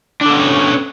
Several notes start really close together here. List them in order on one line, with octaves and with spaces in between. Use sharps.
D4 A4 B3 C#4 C#5